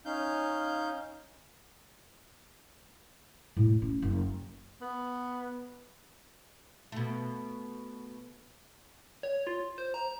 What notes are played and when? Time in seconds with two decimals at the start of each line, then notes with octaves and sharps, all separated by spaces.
0.05 C#4 D#4 F5 G6
3.57 A2
3.82 C#4
4.02 F#1
4.81 B3
6.92 B2 A3
9.23 C#5
9.47 F4
9.78 C5
9.94 A#5